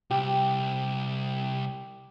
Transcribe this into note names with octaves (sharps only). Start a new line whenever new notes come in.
C2 G4